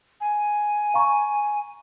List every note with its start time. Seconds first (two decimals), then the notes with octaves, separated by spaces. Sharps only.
0.21 G#5
0.94 F5 A#5 C#6